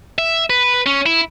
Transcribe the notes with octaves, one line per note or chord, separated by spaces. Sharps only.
E5
B4
C#4
E4